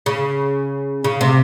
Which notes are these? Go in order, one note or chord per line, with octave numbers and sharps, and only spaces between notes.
C#3
C#3
C3